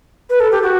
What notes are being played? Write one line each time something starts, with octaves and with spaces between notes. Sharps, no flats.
B4
A4
G4
F#4